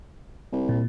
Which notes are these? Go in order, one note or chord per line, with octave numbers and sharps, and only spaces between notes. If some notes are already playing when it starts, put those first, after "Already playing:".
C2
A#2